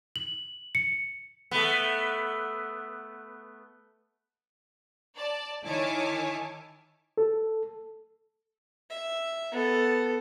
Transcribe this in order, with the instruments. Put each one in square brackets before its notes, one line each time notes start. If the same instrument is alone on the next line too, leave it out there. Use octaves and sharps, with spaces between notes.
[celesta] F#7
C#7
[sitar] A3 B3
[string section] D5 A5
D#3 E4 C#5 G#5 A5 D6
[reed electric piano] A4
[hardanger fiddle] E5
B3 A4